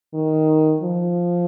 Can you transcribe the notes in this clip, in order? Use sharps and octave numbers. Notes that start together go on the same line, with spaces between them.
D#3
F3